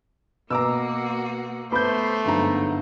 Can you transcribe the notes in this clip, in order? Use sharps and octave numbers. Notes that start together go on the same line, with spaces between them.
B2 A#3 F#4 A#5 D6 E6
A3 B3 C5 B5 D6 G6
G1 G#2 F#3 A#5